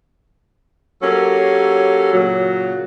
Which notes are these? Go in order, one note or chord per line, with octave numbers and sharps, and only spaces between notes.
F#3 A#3 C#4 G4 A4
A#2 C#3 F#3